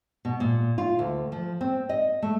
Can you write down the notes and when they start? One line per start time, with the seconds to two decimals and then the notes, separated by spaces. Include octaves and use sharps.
0.25 B2
0.40 A#2
0.78 F4
0.99 D2
1.32 F3
1.61 C4
1.89 D#5
2.22 A3